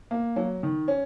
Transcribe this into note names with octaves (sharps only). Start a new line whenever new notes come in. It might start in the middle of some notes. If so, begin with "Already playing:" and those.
A#3
F#3
D#3
C#4